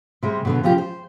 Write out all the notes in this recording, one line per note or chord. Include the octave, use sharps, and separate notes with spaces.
C3 G3 G#3
B2 D3 B3
C#3 F3 F4 G4
C5